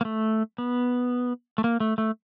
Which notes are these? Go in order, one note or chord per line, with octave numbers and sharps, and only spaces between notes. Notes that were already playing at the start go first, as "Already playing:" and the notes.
A#3
A3
B3
A3
A#3
A3
A3